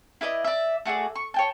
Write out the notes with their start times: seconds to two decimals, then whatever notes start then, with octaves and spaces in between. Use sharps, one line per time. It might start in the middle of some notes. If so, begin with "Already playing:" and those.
0.21 E4 B4 D5 D#5
0.44 D5 E5
0.85 A3 F#4 G#4 D5
1.15 C#6
1.34 C#5 G5 A5